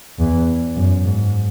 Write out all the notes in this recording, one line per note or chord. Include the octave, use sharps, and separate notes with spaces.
E2
F#2
G#2